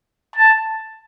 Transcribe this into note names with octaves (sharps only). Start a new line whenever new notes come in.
A5